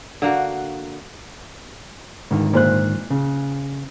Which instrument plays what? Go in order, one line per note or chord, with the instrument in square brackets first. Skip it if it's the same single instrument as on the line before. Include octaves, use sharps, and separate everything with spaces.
[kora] D3 A#3 F#4
[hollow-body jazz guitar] G#2 D3 D#3
[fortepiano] A#2 C5 F#6
[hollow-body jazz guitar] C#3